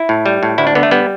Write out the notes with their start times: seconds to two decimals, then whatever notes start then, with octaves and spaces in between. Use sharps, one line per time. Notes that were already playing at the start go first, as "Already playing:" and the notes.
Already playing: E4
0.09 A2
0.26 G3
0.43 A2
0.58 D2 E4
0.67 D4
0.75 D3 B3
0.83 A3
0.91 G3 B3